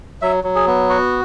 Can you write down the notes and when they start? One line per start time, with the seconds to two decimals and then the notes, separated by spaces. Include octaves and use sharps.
0.22 F#3 E5
0.44 F#3
0.55 G#4
0.67 B3
0.90 F#4